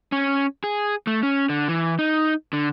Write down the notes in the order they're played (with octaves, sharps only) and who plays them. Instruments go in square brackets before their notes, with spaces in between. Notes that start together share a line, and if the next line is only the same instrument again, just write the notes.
[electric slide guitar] C#4
G#4
A3
C#4
D3
E3
D#4
D3